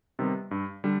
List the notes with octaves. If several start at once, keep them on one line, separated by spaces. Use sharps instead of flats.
C3 D#3 G3 B3
G2
D3 G3